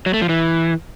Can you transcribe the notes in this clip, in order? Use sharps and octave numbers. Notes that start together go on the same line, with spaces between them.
F#3
A3
F3
E3